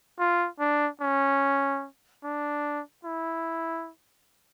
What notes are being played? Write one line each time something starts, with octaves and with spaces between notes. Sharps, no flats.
F4
D4
C#4
D4
E4